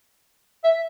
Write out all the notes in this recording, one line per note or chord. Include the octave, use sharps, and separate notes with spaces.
E5